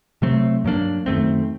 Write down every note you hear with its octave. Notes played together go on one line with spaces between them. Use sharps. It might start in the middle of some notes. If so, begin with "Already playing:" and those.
C3 F#3 A3 C4
G2 F#3 A#3 D4
F#2 D#3 A3 C4